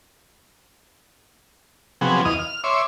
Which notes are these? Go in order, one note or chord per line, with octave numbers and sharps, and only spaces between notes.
C3 F3 F#3 B3 G#4
E2 D#5 F5 D#6
F6
C#5 E5 C6 D6